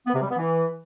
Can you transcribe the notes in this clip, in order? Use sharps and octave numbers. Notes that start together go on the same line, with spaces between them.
B3
C3
G3
B3
E3